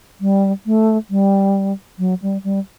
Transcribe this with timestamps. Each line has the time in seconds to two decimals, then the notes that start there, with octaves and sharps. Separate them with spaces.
0.21 G3
0.66 A3
1.10 G3
1.99 F#3
2.22 G3
2.44 G3